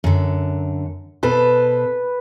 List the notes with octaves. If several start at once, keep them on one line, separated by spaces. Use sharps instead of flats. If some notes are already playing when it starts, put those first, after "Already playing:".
F#2 D3
B2 A4 B4 C5